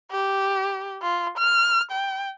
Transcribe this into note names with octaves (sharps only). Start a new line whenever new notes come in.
G4
F4
F6
G5